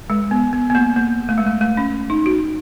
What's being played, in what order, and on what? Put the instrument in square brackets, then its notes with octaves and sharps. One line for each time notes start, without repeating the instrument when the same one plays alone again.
[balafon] G#3
B3
B3
B3
A#3
A#3
A3
G#3
A3
A3
C#4
D#4
F#4